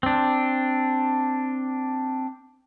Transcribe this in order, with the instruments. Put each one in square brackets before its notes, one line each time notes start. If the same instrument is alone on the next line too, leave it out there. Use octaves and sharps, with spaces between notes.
[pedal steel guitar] C4 D4